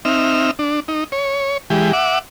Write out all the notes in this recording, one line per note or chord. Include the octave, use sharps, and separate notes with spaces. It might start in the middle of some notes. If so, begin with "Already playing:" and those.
C4 D#4 E5 F6
D4
D#4
C#5
E3 G#3 G4
E5 F#5 D6